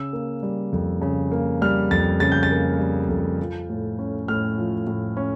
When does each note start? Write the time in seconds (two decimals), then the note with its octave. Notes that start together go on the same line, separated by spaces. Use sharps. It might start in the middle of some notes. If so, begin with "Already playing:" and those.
Already playing: C#3 E6
0.13 A#3
0.43 G3
0.73 F2
1.01 C#3
1.32 A#3
1.61 G3 F6
1.91 F2 A6
2.20 C#3 A6
2.32 G6
2.43 A6
2.51 A#3
2.79 G3
3.09 F2
3.40 F3
3.69 A2
3.99 C#4
4.28 A2 F6
4.57 F3
4.87 A2
5.17 C#4